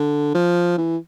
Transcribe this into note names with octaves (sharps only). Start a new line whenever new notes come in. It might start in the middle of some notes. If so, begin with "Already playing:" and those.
Already playing: D3
F3
E3